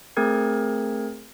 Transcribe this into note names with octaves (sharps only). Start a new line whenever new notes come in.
A3 C4 G#4 A#4 G#6